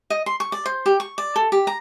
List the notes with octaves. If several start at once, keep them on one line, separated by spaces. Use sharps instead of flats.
D#5
C6
C#6
D5
C5
G4
C#6
D5
A4
G4
A#5